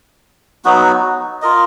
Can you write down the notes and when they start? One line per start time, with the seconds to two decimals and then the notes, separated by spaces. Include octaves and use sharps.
0.65 F#3 B3 D#4 F#4
1.42 F4 A#4 D#5